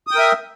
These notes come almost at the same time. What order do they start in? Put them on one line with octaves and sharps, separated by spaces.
D#6 G5 A#4 E5